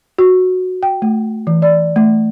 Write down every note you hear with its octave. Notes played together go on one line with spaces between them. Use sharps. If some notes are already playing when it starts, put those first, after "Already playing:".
F#4
G5
A3
E3
D5
A3